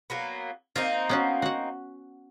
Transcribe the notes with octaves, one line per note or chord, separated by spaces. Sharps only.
F#3 A#3 B3
A#3 C4 D#4 F4
B3 C#4 F#4
F#4 F#5